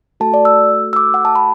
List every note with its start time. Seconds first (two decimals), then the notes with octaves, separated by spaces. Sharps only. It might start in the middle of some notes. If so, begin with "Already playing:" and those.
0.20 A3 F#4 A4 A5
0.34 D5
0.45 E6
0.93 E6
0.96 D6
1.14 F#5
1.25 A5
1.35 B5